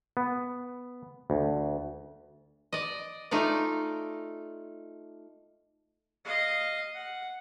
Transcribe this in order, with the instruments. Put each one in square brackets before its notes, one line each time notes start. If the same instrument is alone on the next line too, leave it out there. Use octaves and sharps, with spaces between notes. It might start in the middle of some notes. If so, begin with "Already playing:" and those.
[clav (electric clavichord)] B3
D2
[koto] D5 D#5
A3 D#4 F4 D5
[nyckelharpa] D#5 F5
F#5